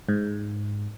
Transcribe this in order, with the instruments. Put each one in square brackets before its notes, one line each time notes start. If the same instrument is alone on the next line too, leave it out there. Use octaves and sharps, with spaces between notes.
[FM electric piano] G#2